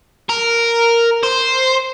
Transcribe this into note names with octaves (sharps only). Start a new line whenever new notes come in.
A#4
C5